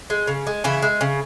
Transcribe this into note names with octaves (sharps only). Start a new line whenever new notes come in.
G#3
C#3
G#3
C#3 E3 E4
G#3
C#3